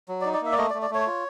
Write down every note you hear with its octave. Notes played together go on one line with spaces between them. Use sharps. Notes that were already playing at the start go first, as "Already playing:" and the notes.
F#3
D5
D#4
D5
A#3 E5
D5
A3 D#5
D5
A3
D5
A3 C#5
F4